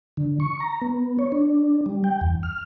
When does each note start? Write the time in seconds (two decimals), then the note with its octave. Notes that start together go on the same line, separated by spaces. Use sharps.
0.17 D3
0.40 C#6
0.60 A#5
0.82 B3
1.19 C#5
1.32 D4
1.86 G3
2.04 G5
2.21 E2
2.43 F6